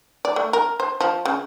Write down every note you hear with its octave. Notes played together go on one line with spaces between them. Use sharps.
D5
A3
A#4
C5
F3
C#3